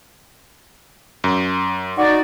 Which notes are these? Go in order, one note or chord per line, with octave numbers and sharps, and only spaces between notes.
F#2
D#4 F#4 D5